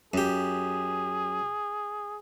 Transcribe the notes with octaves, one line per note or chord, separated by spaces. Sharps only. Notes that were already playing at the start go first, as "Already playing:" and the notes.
F#2 G4 G#4